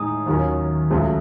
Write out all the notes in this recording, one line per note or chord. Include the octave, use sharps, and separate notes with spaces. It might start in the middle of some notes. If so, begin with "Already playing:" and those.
Already playing: A2 G#3 D#4 G#4 D#6
D#2 D#3 F#3 C#4
C#2 C#3 F#3 A3